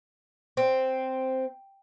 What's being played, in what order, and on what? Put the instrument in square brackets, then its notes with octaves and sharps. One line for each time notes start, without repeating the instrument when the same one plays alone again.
[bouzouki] C4